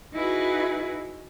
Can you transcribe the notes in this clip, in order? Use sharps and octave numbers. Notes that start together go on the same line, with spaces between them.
D#4 E4 F#4 G#4 B4